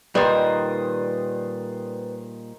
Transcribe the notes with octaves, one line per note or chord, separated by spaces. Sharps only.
A#2 D#3 G3 B4 C5 D5 D#6